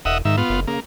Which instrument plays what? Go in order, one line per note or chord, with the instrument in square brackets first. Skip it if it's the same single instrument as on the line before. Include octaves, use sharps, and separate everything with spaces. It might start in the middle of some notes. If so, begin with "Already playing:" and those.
[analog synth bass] E1 [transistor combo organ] D#5 E5 F#5
[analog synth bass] G#2 [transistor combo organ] D#3 E5
[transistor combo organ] B3 F4
[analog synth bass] F#1
[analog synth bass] C#3 [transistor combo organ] A#3